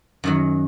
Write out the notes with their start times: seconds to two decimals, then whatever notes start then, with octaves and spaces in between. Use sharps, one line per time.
0.24 F#2 D#3 F#3